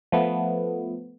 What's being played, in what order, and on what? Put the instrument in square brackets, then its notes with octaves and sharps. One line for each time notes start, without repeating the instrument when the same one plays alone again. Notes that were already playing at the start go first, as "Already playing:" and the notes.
[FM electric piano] F3 A3 B3